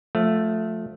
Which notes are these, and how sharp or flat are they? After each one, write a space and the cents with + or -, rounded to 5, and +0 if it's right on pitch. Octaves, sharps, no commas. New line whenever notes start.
F3 +25 A3 +0